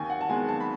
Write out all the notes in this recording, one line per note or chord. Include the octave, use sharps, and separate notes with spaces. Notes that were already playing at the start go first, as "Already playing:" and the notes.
Already playing: D#2 G#5
F#5
A5
D#3 G#3 B3 G#5
A5
B5